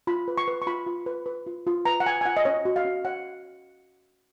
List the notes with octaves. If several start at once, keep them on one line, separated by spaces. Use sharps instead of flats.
F4 B5
B4
C#6
B4
C#6
F4 B5
F4
B4
B4
F4
F4
B4 A#5
F#5
B4 G#5
G#5
F4 F#5
D#5
C#4 C#5
F#4
F5
C#4
C#5 F#5